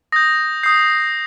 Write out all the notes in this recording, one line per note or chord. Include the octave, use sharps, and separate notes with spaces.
D#6 G6 A#6
D#6 G6 C7